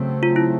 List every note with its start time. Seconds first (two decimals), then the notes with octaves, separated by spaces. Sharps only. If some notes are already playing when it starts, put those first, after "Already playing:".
Already playing: C#3 F#3 A3 C4
0.23 F4
0.36 E4